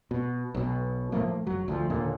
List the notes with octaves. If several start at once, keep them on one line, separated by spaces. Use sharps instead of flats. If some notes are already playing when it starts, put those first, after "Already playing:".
B2
B1 B2
A2 F3 A3 A#3
F#1 F#3
D2 C3 F3
D#2 A#2 D3